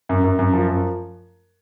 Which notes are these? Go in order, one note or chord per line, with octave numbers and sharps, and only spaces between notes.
F#2
F#2
F#2
F3
F#2